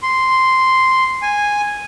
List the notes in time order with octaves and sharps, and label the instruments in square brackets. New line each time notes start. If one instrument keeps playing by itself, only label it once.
[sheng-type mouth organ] C6
G#5